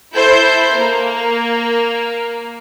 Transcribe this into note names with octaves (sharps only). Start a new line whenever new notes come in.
E4 A4 C5 G6
A#3